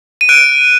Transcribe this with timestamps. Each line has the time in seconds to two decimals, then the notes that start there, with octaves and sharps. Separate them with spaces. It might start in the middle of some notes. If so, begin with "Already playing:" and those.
0.21 D#7
0.29 F#6 D7